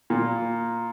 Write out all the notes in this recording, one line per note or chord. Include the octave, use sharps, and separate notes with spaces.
A#2